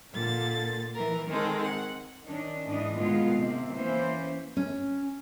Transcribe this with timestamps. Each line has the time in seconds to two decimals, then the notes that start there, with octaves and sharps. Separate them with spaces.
0.13 A#2 D3 A6
0.93 E3 A#4
1.28 D#3 G#3 C4 A4
1.62 F#5
2.25 D#3 C#4 D4
2.65 G#2 E3 D4 D#5
2.98 B2 D#3 G#3 B3 F4
3.38 C3 A#3 C4
3.72 E3 A#3 C#4 C5
4.57 C#4